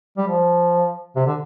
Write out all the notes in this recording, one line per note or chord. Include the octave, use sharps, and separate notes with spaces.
G3
F3
C3
D3